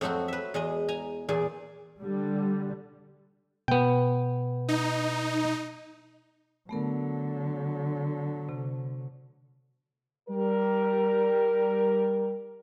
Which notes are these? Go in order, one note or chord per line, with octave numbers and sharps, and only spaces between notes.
F2 F#3 A3 C4 F#4
B4 E5
E2 G#3 D#5
G#5 A#5
E2 A#2 G#4 D5
D3 G3
B2 B3 G5
D#4
D3 F#3 A3 B3 A#4
C3
G3 A#4